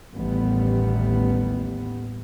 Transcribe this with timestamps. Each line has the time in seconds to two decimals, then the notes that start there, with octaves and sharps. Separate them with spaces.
0.16 A1 D#2 A2 G3 B3